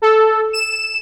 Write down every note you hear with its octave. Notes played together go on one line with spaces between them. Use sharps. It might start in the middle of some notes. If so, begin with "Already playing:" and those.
A4
E7